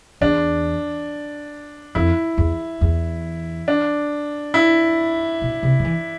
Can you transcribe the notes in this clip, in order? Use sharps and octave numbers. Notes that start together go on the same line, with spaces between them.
E2 D4
F2 E4
E2
E2
D4
E4
B2
C3
F3
E3